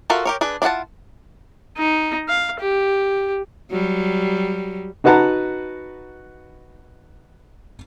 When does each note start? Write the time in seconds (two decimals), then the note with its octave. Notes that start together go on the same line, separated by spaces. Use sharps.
0.10 F4 F#4 A4 A#4 E5
0.25 G4 A#4 C#5
0.41 D4 G#4 B4
0.62 D4 E4 F4 F#5 A5
1.78 D#4
2.29 F5
2.60 G4
3.71 F#3 G3
5.04 D#4 F#4 B4 F#5 A5 A#5